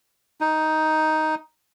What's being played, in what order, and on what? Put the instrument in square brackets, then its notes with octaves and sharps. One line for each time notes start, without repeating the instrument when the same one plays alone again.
[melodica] D#4